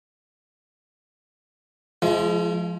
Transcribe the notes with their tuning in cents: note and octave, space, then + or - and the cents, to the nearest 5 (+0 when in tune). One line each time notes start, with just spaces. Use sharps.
F3 +0 G#3 +25 F4 -45